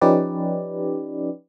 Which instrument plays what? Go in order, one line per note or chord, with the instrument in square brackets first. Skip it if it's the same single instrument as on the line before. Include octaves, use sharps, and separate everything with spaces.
[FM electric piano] F3 C#4 D#4 G4 B4 D5